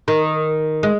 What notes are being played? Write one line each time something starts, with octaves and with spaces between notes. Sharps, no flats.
D#3
G#3